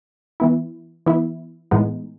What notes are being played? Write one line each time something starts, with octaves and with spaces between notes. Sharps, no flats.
E3 B3 E4
E3 B3 E4
A2 E3 G#3 B3 D#4